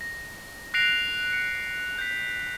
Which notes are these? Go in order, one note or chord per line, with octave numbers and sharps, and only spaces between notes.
A#6
F#6 A#6 C7 D7 F7
C#7
G6 B6